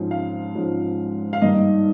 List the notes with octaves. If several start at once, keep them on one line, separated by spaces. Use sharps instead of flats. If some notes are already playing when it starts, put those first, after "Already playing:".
Already playing: G#2 F3 G#3 C#4
F5
G#2 F3 G#3 C#4
F5
G2 D#3 A#3 D#4 D#5